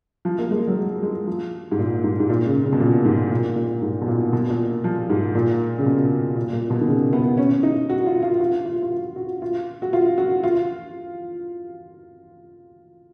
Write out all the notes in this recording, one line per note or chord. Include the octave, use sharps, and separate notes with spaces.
F3
A#3
G#3
F#3
G#3
G#3
F3
G#2
A#2
G#2
G#2
A#2
C#3
C#3
B2
A#2
G#2
A#2
A#2
G#2
B2
A#2
B2
A#2
F3
G#2
A#2
C#3
B2
A#2
A#2
B2
D#3
C#3
B3
C#4
D#4
F#4
F4
F4
F4
F4
F4
F#4
F#4
F4
F#4
F4
F#4
F4